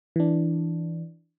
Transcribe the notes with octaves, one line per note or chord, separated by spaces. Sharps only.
E3 D4